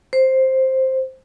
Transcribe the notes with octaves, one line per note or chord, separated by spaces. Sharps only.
C5